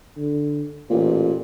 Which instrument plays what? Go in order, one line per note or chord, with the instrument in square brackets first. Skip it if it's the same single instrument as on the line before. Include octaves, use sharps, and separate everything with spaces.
[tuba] D3
[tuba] A1 [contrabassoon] A#2